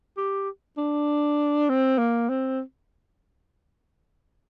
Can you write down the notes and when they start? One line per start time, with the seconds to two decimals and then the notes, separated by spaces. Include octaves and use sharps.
0.17 G4
0.77 D4
1.69 C4
1.98 A#3
2.29 C4